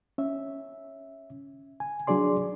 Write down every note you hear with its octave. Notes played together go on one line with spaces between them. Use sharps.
C#4 E5
G#5
F#3 D4 G#4 D5 C6